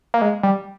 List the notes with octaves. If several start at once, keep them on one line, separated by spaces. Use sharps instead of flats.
A#3
G#3
G3